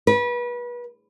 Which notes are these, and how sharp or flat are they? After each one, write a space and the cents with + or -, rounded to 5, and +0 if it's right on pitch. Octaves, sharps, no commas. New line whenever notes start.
B4 -30